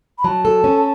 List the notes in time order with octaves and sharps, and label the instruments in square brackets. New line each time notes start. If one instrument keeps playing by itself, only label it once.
[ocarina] B5
[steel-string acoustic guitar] F#3 [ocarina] A5
[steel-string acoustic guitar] A4
C#4